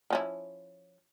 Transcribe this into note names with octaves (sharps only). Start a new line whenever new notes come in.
F3 C#4 E4